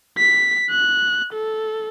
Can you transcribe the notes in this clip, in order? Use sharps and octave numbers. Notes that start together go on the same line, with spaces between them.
B6
F#6
A4